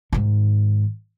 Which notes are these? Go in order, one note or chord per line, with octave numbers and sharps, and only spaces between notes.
G#2 D#3